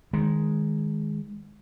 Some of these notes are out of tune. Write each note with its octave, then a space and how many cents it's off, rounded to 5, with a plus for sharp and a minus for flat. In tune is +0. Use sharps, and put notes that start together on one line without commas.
D#3 +0 G#3 +0